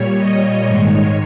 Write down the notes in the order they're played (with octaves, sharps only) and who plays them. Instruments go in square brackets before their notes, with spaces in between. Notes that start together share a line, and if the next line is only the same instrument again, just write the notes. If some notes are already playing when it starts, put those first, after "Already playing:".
Already playing: [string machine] A#2 G3 C#5
D#5
G#2 D#3 G#3 C#5